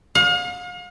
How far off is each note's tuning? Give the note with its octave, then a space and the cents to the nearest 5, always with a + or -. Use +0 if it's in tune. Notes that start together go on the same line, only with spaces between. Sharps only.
F5 +40